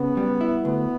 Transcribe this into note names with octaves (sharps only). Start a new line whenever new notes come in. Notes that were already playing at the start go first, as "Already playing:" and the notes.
Already playing: C#3 B3
G3
E4
D2 B3